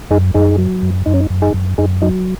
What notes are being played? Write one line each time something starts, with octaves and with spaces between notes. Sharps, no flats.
F#2 D#4 G#4
F#2 D#4 G#4
F#3
F#2
F#2 D#4
C#4
D#4
F#2
D#4 G#4
F#2
F#2 D#4 G#4
F#3 D#4